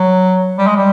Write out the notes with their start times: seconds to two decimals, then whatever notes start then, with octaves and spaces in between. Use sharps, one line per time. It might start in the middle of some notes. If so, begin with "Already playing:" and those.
Already playing: F#3
0.58 G3
0.67 G#3
0.76 G3